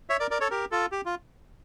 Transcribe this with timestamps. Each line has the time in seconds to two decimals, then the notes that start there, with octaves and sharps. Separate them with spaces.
0.09 C#5 E5
0.20 A#4 D5
0.31 A#4 D5
0.40 A4 C#5
0.51 G4 A#4
0.71 F4 A4
0.92 G4
1.05 F4